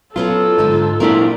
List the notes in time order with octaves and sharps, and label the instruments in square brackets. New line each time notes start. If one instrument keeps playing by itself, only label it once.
[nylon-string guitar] F#3 B3 C#4 [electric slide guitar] F4 [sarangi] A4
[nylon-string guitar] G#2 D3 D#4
[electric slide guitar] A#2 C4 E4 [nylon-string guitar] D4 F4 A#4